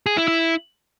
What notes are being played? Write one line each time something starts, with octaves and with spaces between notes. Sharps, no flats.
G#4
E4
E4